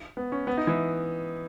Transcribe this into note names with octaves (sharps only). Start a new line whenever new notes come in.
B3
C#4
B3
D#4
E3